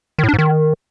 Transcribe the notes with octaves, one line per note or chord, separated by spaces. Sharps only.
D#3
A2
D4
G#2
D#3